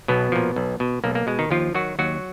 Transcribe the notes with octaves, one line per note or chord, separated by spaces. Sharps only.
B1 B2 B3
A#2 F3
B1
B2
B1 A#3
A#3
B2 G#3
D#3 D#4
D#2 F3 F4
D#3 F#3 F#4
D#2 F#3 F#4